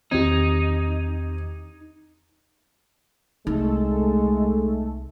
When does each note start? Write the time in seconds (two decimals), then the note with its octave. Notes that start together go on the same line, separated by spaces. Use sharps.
0.11 E2 D#3 C4 D#4 G4 G#6
3.47 C2 G#3 A3 D#4 A4